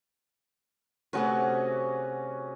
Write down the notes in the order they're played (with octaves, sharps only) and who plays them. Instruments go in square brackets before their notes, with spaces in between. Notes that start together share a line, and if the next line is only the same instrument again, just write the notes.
[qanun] C3 A3 B4 [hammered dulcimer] C#4 F#4 G#4